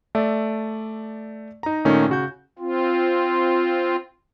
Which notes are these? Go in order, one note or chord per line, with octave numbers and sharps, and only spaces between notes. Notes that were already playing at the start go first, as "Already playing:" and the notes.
A3 D5 E5
D#4 A#5
A#2 D#3 A3 C#4 D#4
C#3 F#4 G6
C4 F4